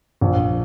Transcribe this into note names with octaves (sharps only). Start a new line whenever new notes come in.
A#1